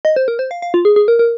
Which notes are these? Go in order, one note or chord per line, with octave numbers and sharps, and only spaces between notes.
D#5
C5
A#4
C5
F5
F5
F4
G#4
G#4
A#4
A#4